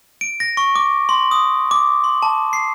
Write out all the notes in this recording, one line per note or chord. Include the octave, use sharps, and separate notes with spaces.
D7
A#6
C#6
D6
C6
D#6
D6
C6
A5
C7